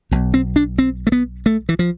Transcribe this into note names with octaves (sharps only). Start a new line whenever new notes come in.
B1 B2
C4
D4
C4
A3
B3
A3
E3
F3